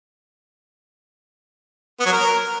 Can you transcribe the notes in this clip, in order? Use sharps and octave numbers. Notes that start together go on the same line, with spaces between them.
B3
F#3
A#4